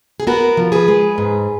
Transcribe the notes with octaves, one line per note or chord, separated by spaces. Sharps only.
G#4
B3 F#4 A#4
F3
G#4 B4
G#3
G#2